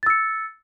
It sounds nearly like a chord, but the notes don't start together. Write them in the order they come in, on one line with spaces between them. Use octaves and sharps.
A6 E6 C#7